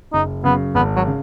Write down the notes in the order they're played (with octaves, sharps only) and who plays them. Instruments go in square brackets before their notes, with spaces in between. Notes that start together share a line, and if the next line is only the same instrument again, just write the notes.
[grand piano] F#1 [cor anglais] D#4
[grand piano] F#2 C#3 [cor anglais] B3
[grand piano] G#1 [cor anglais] B3
[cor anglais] F#3
[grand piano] C#3